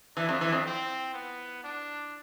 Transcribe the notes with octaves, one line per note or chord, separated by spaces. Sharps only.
E3 D4
F2
E3
F2
C4
B3
D4